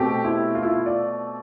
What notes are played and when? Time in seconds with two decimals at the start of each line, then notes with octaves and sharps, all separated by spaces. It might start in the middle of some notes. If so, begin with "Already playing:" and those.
Already playing: B2 A3 C4 G4
0.24 E4
0.55 F4
0.63 E4
0.71 F4
0.86 D5